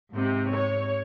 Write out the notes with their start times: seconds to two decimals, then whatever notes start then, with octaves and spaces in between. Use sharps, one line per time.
0.15 G#2 C3
0.54 C#5